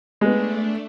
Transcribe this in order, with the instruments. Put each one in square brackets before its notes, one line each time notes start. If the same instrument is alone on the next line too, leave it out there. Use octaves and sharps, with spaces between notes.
[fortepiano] G#3 B3 [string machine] A3 D4